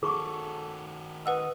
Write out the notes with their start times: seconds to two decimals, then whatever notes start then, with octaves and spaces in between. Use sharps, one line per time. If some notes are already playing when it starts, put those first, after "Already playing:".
0.03 D#3 F#4 G#4 A4 C#6 D6
1.26 B4 D#5 F#5 E6